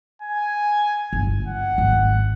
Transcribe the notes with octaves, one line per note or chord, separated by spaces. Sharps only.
G#5
G1
F#5
G#1